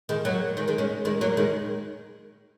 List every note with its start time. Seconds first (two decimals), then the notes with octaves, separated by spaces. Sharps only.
0.09 D#3 G#3
0.25 F#3 A#3
0.57 D#3 G#3
0.68 D#3 G#3
0.78 G#3 C#4
1.05 D#3 G#3
1.21 F#3 A#3
1.37 D#3 G#3